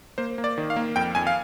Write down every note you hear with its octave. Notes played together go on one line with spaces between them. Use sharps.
A#3 C5
A#3
D5
D#3
F5
A#3
F2 G5
F2 G#5
F5